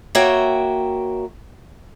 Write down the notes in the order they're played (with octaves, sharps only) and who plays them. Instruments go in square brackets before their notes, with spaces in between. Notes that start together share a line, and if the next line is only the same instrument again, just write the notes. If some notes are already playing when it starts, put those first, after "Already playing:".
[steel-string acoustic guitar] A#3 F#4 C#5 E5 G5